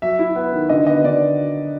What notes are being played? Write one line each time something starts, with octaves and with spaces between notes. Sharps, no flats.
F#3 E5
E4
B3
D#3
D3 D#5
B3 D#5
D3 D5